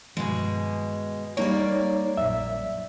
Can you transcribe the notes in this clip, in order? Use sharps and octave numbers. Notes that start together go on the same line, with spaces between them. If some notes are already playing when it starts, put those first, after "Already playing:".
G2 B2 D#3 F3 G#3
G3 A#3 D#4 C#5 D5
A#1 F#2 E5